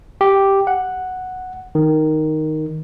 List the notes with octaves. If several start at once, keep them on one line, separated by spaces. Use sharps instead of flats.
G4
F#5
D#3